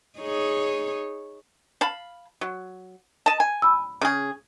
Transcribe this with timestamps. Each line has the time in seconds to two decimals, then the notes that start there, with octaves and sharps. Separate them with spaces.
0.18 D#4 G#4 C#5
1.81 F5 A5 B5
2.41 F#3
3.26 D#5 A5
3.40 G#5
3.62 B5 E6
4.01 C#3 G#4